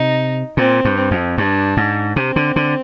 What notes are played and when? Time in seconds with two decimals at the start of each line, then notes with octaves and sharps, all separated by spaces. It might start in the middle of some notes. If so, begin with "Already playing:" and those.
Already playing: C3 D#4
0.57 A#2 C4
0.85 G2
0.98 C4
1.11 F2
1.37 G2 D4
1.77 G#2
2.16 C3 C4
2.36 D3
2.56 D3